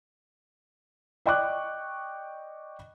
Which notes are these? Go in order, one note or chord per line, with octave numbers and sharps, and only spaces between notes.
D5 D#5 G5 C#6 D6 F#6